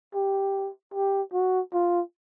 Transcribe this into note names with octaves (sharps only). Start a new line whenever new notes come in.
G4
G4
F#4
F4